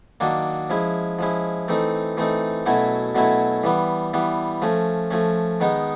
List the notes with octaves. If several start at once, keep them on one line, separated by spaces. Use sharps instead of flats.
D#3 F#3 A#3 D4
F3 G#3 C#4 E4
F3 G#3 C#4 E4
E3 A3 C4 D#4
E3 A3 C4 D#4
B2 F#3 A3 C#4 E4
B2 F#3 A3 C#4 E4
E3 G3 B3
E3 G3 B3
F3 A3 C#4
F3 A3 C#4
D#3 G#3 B3 D#4